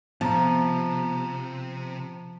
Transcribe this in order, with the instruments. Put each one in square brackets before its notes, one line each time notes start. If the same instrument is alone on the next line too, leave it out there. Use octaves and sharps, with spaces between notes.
[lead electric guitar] C3 [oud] F3 [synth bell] B3 [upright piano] A5 A#5